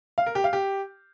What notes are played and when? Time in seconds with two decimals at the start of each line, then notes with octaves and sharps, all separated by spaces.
0.18 F5
0.26 A#4
0.35 G4
0.44 F5
0.53 G4